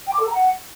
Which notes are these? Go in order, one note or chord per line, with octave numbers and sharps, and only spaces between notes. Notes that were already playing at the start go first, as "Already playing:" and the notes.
G5
D6
A4
A#5
F#5